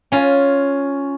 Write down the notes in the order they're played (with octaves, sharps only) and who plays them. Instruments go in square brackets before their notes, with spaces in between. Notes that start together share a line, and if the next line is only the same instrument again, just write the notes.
[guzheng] C#4 F4